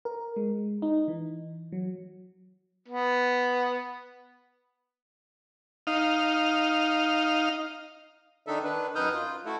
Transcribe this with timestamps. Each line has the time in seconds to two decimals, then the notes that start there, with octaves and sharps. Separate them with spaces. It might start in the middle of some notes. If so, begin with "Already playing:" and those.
0.05 A#4
0.36 G#3
0.82 D#4
1.08 E3
1.72 F#3
2.88 B3
5.87 D#4 F5
8.47 D#3 D4 D#4 A4 E5
8.64 D#3 D4 B4
8.95 F#2 D#4 B4 D#6 F6 G6
9.14 F4
9.45 A3 E4 F#4 A4